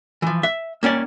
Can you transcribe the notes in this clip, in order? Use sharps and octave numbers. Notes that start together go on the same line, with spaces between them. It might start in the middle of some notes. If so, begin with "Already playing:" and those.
E3 F3
E5
A#3 C#4 C#5 D5